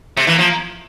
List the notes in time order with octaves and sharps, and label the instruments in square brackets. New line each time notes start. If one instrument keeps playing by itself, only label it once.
[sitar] C3 [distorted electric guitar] A3
[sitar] E3 [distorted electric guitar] A#3
[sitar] F3 [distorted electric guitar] A#3